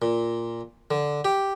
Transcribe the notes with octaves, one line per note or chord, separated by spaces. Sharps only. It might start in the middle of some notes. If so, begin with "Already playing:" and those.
A#2
D3
G4